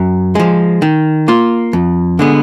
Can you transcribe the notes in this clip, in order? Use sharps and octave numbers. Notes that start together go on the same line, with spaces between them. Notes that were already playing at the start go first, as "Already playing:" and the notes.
Already playing: F#2
F3 G#3
D#3
A#3 F4
F2
D3 G#3 B3